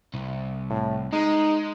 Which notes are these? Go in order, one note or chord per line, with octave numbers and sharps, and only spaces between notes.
C2
A2
G#3 D#4